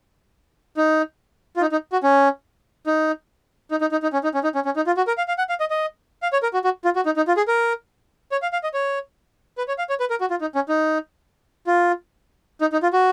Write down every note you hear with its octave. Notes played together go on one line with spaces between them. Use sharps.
D#4
F4
D#4
D#4
F#4
C#4
D#4
D#4
D#4
D#4
D#4
C#4
D#4
C#4
D#4
C#4
C#4
D#4
F4
F#4
A#4
F5
F5
F#5
F5
D#5
D#5
F5
C#5
A#4
F#4
F#4
F4
F#4
D#4
D#4
F4
G#4
A#4
C#5
F5
F5
D#5
C#5
B4
C#5
F5
C#5
B4
A#4
F#4
F4
D#4
C#4
D#4
F4
D#4
D#4
F4
F#4